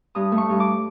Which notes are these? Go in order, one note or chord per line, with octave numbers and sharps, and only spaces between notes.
G2 D#6
A3
C#6
G2
D6